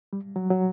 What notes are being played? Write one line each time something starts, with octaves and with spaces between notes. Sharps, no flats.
G3
F#3
F#3